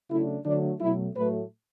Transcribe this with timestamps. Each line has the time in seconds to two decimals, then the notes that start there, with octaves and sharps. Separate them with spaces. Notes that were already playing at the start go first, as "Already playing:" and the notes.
0.11 C#3 F#3 A3 D4 E4
0.45 D3 F#3 A3 D4
0.80 B2 F#3 A3 E4
1.16 A2 F#3 A3 B4